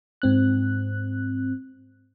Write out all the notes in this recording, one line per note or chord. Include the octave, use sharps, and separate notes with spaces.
G#2 C4 F#6